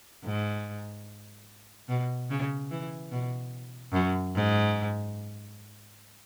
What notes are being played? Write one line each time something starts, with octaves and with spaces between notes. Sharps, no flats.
G#2
B2
C#3
E3
B2
F#2
G#2